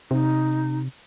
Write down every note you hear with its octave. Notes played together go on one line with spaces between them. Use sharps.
C3 D#4